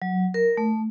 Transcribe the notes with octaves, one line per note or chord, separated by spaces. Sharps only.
F#3
A#4
A3